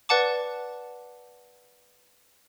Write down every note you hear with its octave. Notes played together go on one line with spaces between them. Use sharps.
B4 D5 F#5 A5 D6